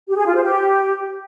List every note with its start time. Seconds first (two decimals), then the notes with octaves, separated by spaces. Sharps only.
0.08 G4
0.17 G#4
0.26 F4
0.35 C5
0.44 G4